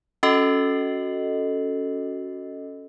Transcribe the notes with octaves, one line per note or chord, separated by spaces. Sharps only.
C#4 F#4 A4 D#5